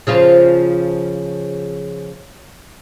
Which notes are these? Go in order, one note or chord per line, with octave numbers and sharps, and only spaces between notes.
C#3 F3 F4